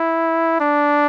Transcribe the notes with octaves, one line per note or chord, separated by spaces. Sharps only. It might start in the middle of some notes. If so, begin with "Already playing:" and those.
Already playing: E4
D4